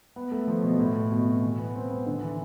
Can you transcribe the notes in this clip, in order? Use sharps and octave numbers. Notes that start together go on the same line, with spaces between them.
B3
A3
F3
B2
A2
B2
C3
E3
B3
C4
B3
D3
E3